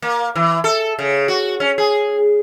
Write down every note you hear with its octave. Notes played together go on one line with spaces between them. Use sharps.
A#3
E3
A4
C#3
F#4
C#4
G#4